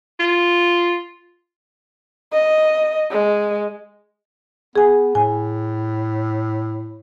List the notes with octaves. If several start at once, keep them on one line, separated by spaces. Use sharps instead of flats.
F4
D#5
G#3
B3 G#4 G#5
A2 G#5